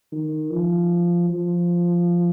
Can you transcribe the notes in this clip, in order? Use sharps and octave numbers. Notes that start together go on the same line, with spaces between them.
D#3
F3
F3